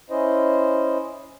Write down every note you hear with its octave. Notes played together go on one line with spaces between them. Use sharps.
C#4 E4 C5 D#5